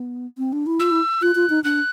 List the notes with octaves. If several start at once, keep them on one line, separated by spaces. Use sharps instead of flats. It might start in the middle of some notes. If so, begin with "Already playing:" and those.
Already playing: B3
C4
D4
E4
F4 E6
E4
F4 F#6
F4
D#4
D4 F#6